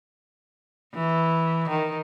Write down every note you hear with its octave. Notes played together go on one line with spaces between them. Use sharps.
E3
D#3